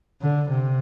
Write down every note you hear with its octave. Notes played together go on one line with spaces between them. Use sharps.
D3
C3